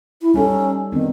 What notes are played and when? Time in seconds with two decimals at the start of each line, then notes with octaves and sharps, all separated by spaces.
0.22 E4
0.34 G3 C#4 D#4 A4
0.92 D#3 B3 C4 D4